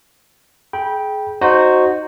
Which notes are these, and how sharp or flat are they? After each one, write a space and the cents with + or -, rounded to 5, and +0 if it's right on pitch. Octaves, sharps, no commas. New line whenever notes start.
G#4 +30 G5 +0 B5 -25
D#4 -15 F#4 +0 C5 +0